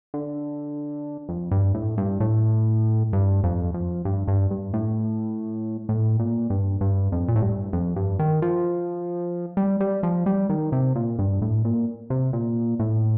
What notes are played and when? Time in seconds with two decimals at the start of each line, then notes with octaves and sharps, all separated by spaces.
0.14 D3
1.29 F2
1.51 G2
1.74 A2
1.98 G2
2.20 A2
3.13 G2
3.44 F2
3.74 F2
4.05 G2
4.28 G2
4.51 G2
4.74 A2
5.89 A2
6.20 A#2
6.50 G2
6.81 G2
7.12 F2
7.28 A#2
7.36 A2
7.42 G2
7.73 F2
7.96 G2
8.19 D#3
8.42 F3
9.57 G3
9.80 G3
10.03 F3
10.26 G3
10.49 D#3
10.72 C3
10.95 A#2
11.19 G2
11.42 A2
11.65 A#2
12.10 C3
12.33 A#2
12.79 A2